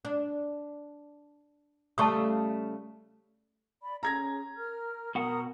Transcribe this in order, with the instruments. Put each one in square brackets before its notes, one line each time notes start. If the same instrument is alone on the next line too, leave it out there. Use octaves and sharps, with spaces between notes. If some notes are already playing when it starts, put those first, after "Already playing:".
[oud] D4
[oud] C#3 G3 A3 [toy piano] A5 C#6 D#6
[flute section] D5 B5
[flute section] C#4 G#4 [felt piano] A#5 G#6 A#6
[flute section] A#4 F6
[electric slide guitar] B2 F#5 [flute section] A#4 D#6